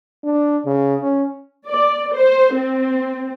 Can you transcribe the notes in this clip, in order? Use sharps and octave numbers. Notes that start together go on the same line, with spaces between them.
D4
C#3
C#4
D5
C5
C4